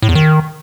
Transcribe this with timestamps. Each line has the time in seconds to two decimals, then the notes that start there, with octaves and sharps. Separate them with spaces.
0.02 A2
0.09 E2
0.15 D#3